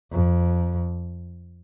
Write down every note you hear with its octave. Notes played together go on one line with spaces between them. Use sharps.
F2